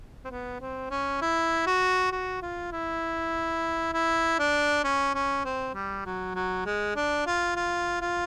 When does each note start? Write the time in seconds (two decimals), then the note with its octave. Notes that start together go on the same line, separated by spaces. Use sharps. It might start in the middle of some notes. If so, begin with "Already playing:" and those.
0.25 C4
0.30 B3
0.61 C4
0.91 C#4
1.22 E4
1.67 F#4
2.12 F#4
2.42 F4
2.72 E4
3.94 E4
4.39 D4
4.84 C#4
5.15 C#4
5.45 C4
5.75 G3
6.05 F#3
6.35 F#3
6.66 G#3
6.96 D4
7.27 F4
7.56 F4
8.01 F4